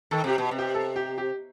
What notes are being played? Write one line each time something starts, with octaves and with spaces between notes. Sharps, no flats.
D#3 A4
C3 G4
B2
C3
G4
A4
G4
G4